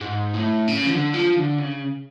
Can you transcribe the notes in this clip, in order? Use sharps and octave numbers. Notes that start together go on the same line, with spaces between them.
G#2
A2
C#3
F3
D3
F3
D3
C#3